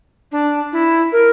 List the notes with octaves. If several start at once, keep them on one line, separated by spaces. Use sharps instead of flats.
D4
E4
A#4